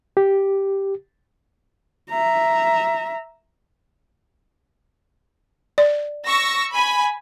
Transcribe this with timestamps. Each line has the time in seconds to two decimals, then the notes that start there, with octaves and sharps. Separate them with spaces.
0.17 G4
2.10 E5 A#5
5.78 D5
6.26 C#6 E6 A#6
6.74 G#5 B5